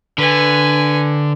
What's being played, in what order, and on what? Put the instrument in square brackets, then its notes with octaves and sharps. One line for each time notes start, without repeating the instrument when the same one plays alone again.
[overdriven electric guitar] D3 [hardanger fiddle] B4 G#5